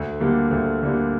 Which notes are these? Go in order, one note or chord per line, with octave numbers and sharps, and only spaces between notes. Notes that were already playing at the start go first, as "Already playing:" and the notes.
Already playing: D2
D3 G3 A#3
D2
D3 G3 A#3